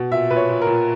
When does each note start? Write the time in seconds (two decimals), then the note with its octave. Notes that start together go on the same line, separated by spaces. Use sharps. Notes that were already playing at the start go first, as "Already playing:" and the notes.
Already playing: B2
0.11 A#2 E5
0.30 A#2 B4
0.37 C#5
0.49 A#2
0.62 A#4
0.67 A#2